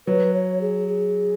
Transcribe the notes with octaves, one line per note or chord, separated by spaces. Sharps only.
F#3 B4
C#5
G#4
G#4